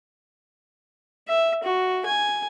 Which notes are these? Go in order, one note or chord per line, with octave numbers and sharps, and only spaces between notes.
E5
F#4
G#5